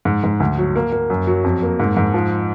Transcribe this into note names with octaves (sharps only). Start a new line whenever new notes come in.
G#2
G#2
D2
F#3
A#3
A#3
F#2
F#3
F2
A#3
G#2
G#2
F3